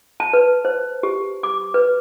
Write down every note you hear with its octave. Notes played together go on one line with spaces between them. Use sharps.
A5
B4
C5
G4
D6
B4